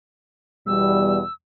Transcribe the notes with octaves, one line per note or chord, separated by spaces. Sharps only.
E2 B2 G3 E6